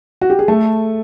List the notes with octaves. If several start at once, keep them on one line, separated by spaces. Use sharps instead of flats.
F#4
G4
G#4
A3 A4